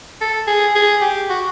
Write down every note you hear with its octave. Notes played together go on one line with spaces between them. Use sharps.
A4
G#4
G#4
G4
F#4